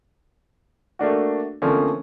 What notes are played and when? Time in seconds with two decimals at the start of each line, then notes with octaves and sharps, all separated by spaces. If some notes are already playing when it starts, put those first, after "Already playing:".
0.99 A3 A#3 D4 F#4
1.62 D3 F3 A3 A#3 C4 C#4